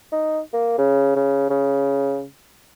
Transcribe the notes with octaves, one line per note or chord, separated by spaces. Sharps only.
D#4
A#3
C#3
C#3
C#3